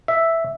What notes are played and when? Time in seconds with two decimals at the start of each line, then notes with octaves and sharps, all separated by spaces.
0.08 E5